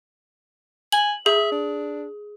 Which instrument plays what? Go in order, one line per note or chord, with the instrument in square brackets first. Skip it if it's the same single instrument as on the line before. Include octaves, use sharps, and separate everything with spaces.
[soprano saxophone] G#5 [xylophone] F#7
[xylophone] G#4 [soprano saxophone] E5
[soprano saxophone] D4